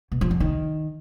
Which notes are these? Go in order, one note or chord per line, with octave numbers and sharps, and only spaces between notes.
B2
F3
E2
D#3